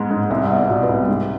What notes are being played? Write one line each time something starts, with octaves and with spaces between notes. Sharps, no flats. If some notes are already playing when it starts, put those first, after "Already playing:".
Already playing: G#2 G#3 B3
G#2
C2 E5
B3
D5
B2
B4
C2
G#2